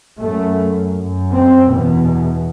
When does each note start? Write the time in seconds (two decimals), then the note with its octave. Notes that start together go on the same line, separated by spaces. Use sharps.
0.18 F#2 A3
0.94 F#2
1.32 C4
1.70 E2 B2